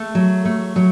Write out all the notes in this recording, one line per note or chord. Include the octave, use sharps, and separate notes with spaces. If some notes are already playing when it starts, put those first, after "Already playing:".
Already playing: A3
F#3
A3
F#3